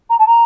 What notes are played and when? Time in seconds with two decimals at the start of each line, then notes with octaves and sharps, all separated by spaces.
0.09 A#5
0.19 A5
0.27 A#5